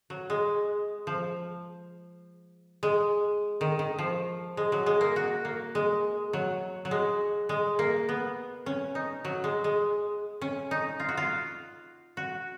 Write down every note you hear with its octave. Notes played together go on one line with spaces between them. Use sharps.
F#3
G#3
F3
G#3
D#3
D#3
F3
G#3
F#3
G#3
A#3
F#4
A#3
G#3
F#3
F#3
G#3
G#3
A#3
B3
C#4
D#4
F#3
G#3
G#3
C#4
D#4
F4
F#4
F4
F#4